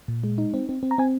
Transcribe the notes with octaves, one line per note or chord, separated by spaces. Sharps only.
A#2
G#3
D#4
C4
C4
C4
A#5
C4 G#5